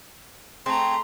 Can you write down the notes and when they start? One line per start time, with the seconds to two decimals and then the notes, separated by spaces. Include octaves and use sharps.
0.66 A3 C4 G#4 A#5 C6